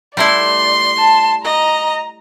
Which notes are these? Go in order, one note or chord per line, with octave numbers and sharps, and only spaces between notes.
G3 A3 E4 D5 C6
A5
D#5 A#5